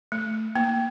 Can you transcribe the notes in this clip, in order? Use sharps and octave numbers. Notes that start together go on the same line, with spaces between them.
A3
A#3